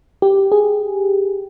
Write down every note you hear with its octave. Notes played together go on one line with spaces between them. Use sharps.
G4
G#4